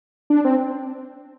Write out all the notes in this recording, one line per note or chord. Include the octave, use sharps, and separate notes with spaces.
D4
C4